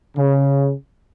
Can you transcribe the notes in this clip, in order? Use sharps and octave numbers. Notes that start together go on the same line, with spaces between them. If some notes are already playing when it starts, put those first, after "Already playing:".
C#3